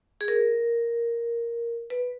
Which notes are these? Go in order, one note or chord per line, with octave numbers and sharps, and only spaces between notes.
G#4
A#4
B4